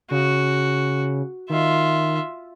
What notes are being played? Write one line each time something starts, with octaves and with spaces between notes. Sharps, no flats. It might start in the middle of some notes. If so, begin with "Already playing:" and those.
C#3 F#4
D#3 F4 E5